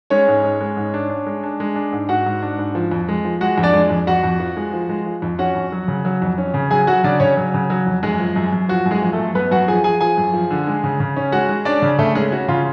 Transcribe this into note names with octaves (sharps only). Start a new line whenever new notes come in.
G#3 C#4 C#5
G#2
G#3
G#3
G#2
D4
D4
G#3
D4
G#3
D4
G#2
G#2 F#4 F#5
G#2
D4
G#2
F3
F2
G#3
F3
G#3 F#4 F#5
F2
D4 D5
G#3
F2
F2 F#4 F#5
F2
F3
G#3
F3
G#3
F3
F2
C#4 F#4 F#5
F2
F#3
C#3
F#3
F2
C#4
C#3
F#3 G#4 G#5
F#3 F#4 F#5
C#3 D4 D5
C#3 C#4 C#5
F#3
C#3
F#3
F2
F#2 G#3 G#4
F3
F#2
F#2
F3 F#4
F#2
G#3 G#4
F3
A3 A4
F#2
F#2 B3 B4
F#2 F#4 F#5
F3 G#4 G#5
F3 G#4 G#5
F3 G#4 G#5
F#2
F3
D3
G#3
C#3
C#3
C#4
G#3 F#4 F#5
G#3
C#4 D4 D5
C#3
C#3 A3 A4
G#3 C#4 G#4
C#4 F#4
C#3 F4